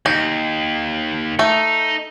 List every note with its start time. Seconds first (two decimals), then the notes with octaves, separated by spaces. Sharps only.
0.06 D#2 D#4
1.39 A3 D#4